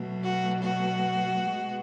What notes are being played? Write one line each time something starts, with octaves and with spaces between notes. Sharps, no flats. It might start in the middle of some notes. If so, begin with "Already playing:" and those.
Already playing: B2 F#3 A3
F#4
F#4
B2 G#3 B3